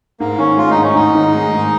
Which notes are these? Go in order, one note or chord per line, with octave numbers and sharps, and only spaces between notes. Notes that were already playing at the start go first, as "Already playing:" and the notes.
G#2 A#3
D#3 C#4
G#3 F4
D#4
G#2
C#4
G#2 D#4
D#3
G#3
G#2